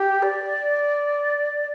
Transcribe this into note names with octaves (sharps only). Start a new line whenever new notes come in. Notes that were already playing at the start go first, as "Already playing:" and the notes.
Already playing: G4
D5